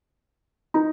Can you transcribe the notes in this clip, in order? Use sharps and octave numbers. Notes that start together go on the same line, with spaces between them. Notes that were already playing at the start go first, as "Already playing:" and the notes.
D#4